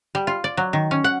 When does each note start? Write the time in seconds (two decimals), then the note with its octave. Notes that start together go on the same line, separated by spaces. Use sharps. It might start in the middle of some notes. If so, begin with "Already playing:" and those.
0.15 G3
0.27 F4
0.44 D5
0.57 F#3
0.73 D#3
0.91 C#4
1.04 F#5